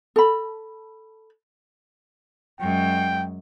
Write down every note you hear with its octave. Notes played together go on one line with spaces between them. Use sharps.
A4 B5
F#2 G#3 G5